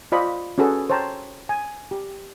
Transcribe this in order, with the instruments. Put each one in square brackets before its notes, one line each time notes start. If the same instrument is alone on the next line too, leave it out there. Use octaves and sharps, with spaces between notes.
[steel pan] F4 C5 D5 D#5 B5
C#4 F#4 G#4 A4 B4
C5 C#5 G5 A5 A#5
G#5
G4